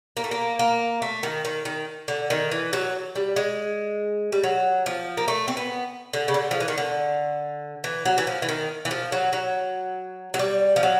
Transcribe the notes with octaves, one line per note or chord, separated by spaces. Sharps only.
A#3
A3
A#3
A#3
A3
D#3
D#3
D#3
D3
D#3
E3
F#3
G3
G#3
G3
F#3
F3
A#3
A3
C4
B3
D3
C#3
D3
F3
E3
D#3
D3
E3
F#3
E3
F3
E3
D#3
E3
F3
F#3
F#3
F#3
G3
F3
F#3